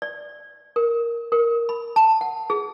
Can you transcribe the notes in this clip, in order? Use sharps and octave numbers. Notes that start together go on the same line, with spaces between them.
D5
A#4
A#4
B5
A5
F#5
G#4